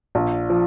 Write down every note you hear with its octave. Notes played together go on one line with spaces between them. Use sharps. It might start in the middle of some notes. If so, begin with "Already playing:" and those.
A#1
F3